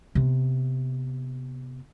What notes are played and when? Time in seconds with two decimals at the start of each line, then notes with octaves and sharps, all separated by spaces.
0.15 C3 B3